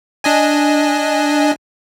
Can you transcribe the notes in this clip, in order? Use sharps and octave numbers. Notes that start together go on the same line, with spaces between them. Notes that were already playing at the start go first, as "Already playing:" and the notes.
D4 D#5 G#5